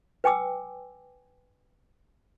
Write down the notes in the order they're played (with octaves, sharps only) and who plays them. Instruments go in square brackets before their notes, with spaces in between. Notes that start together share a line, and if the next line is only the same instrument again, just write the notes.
[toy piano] B4 G5 G#5 D6 E6